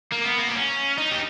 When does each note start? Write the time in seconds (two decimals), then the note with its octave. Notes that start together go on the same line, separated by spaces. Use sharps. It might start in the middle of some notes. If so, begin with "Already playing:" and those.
0.12 A#3
0.25 B3
0.39 A#3
0.47 B3
0.55 C#4
0.98 D#4
1.11 G4